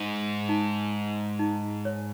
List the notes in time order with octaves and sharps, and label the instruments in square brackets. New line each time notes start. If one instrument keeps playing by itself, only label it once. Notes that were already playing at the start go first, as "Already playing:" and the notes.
Already playing: [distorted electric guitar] G#2
[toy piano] D#4
D#4
C#5